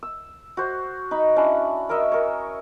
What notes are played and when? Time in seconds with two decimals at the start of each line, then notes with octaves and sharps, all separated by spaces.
0.03 E6
0.57 F#4 C5
1.11 D#4 B5
1.36 C#4 D4 E4
1.89 A#4 C#5 D#5 E5
2.12 A#4 C#5